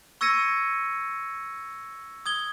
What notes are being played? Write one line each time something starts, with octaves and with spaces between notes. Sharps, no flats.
C#6 E6 G#6 A#6 C#7 D#7
D#6 G#6 G7